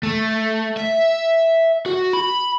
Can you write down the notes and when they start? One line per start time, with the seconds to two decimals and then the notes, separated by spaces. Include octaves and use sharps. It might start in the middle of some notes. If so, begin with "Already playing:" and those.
0.03 A3
0.77 E5
1.86 F#4
2.13 B5